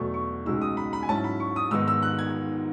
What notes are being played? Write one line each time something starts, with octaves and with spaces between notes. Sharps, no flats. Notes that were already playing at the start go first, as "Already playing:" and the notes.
Already playing: E2 B2 F#3 A3 C#6
C#6
C#2 B2 G#3 D#4 E6
D#6
B5
B5
G#5
G#2 F#3 C#4 E4 A5
B5
C#6
D#6
G#2 D#3 G#3 B3 D#4 E6
E6
F#6
G#6